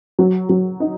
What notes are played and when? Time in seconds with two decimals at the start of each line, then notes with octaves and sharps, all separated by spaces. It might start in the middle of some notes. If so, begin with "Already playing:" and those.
0.19 F#3
0.49 F#3
0.80 D#4